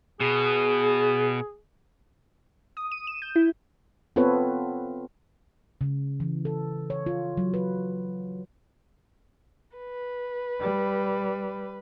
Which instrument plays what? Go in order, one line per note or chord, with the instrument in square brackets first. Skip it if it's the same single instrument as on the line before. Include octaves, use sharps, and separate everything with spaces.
[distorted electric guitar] B2 [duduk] G#4
[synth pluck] D#6
D#7
E7
G6
E4
[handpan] B3 C4 F4 A4 B4 C#5
C#3
E3
A4
C#5
F4
F#3
B4
[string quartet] B4
[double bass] G3